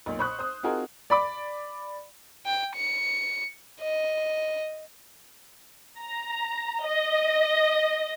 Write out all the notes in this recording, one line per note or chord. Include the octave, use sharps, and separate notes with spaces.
B1 A#2
C5 B5 C#6 D#6 F#6
C5 D#6
C4 D#4 F4 F#4 G#4 A#4
D5 B5 D6
G5
C#7
D#5
A#5
D#5